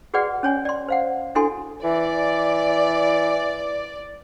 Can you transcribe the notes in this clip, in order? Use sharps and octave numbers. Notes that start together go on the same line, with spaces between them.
F#4 G#4 B4 D5 F#5
C#4 C#5 G#5
D5 C6
C5 F5 F#5
D4 E4 F#4 A4 G#5 C6
E3 D5